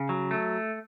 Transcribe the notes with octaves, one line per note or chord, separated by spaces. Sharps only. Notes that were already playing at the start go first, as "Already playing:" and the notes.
Already playing: C#3
F#3
A3